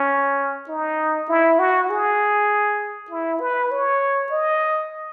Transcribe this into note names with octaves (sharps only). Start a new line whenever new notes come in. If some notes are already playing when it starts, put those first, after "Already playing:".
Already playing: C#4
D#4
E4
F#4
G#4
E4
B4
C#5
D#5